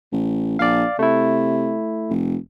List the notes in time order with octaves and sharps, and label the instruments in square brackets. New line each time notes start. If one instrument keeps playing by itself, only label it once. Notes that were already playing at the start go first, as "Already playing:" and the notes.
[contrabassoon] A1
[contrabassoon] A#1 [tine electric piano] D5 F5
[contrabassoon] C3 [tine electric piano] A3 E4
[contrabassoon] F1